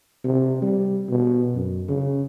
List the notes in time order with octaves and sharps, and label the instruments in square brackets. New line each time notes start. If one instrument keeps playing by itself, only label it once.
[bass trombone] C3
G3
B2
F#2
C#3